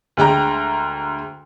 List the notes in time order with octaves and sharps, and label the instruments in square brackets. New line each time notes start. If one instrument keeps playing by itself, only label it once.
[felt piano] D2 G#3 G5 A#5